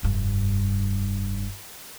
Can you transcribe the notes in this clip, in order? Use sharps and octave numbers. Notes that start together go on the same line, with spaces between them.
F1 G2